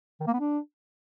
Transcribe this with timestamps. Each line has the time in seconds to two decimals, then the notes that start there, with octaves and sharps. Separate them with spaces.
0.20 D#3
0.27 A#3
0.33 B3
0.40 D4